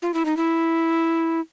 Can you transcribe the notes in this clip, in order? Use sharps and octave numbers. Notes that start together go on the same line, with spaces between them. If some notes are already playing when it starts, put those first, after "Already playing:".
F4
E4
D#4
E4